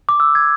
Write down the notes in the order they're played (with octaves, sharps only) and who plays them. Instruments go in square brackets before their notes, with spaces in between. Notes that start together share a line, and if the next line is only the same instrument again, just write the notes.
[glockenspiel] D6
E6
G#6